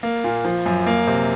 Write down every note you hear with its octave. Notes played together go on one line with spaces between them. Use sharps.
A#3
A#2
F3
F#2
A#3
C3